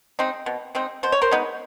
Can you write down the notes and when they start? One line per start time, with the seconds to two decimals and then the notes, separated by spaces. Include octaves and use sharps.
0.19 G#3 C4 D#4
0.46 B2
0.75 G#3 C4 D#4
1.03 B2 C5
1.12 C#5
1.22 A#4 C5
1.31 G#3 B3 D#4